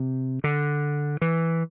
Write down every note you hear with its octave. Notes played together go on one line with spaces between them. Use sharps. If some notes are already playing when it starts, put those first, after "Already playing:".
Already playing: C3
D3
E3